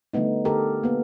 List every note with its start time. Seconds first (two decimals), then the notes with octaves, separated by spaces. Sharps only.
0.13 D3 G3 A3 B3 D#4
0.45 D3 G4 A4 A#4
0.83 A#3 B3